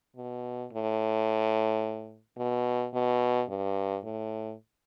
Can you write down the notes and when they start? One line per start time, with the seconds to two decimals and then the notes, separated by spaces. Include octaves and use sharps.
0.16 B2
0.72 A2
2.38 B2
2.94 B2
3.49 G2
4.04 A2